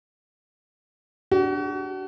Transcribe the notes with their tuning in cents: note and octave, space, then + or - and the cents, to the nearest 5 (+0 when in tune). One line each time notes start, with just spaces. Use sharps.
D4 -5 F#4 +35